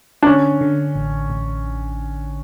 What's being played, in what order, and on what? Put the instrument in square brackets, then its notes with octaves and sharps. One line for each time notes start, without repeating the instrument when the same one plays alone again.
[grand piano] D4
[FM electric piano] D3 [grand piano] C#4
[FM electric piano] D3
A1
A1